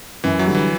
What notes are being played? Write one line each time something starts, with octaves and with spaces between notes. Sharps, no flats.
F#2 E3
F#3
D3 G3
E3